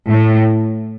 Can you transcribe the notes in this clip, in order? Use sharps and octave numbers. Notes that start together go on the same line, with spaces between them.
A2